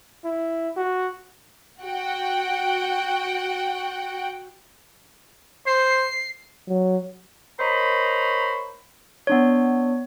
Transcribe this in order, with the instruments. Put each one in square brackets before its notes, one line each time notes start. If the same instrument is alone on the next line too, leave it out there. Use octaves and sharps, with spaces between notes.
[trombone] E4
F#4
[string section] F#4 F#5 G5
[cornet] C5 [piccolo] C7
[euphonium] F#3
[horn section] A#4 C5 C#5 D#5 A#5 B5
[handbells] B3 D4 C#5